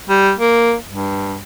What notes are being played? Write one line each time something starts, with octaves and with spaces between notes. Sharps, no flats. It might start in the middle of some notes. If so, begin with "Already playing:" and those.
G3
A#3
G2